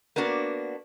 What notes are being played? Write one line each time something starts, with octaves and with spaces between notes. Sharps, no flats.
A#3 B3 D4 F#4